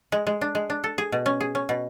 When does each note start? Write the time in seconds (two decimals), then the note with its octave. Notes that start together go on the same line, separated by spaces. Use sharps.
0.12 G#3
0.27 G#3
0.41 D4
0.55 G#3
0.70 D4
0.84 A4
0.98 G#4
1.12 B2
1.26 C#4
1.40 G#4
1.55 C#4
1.69 B2